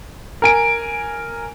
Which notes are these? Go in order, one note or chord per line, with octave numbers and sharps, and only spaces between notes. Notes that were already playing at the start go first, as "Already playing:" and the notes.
A#4 G#5 D7